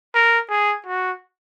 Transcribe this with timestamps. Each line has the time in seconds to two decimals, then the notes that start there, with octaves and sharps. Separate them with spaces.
0.15 A#4
0.50 G#4
0.86 F#4